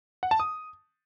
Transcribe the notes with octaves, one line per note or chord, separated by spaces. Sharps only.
F#5
A5
D#6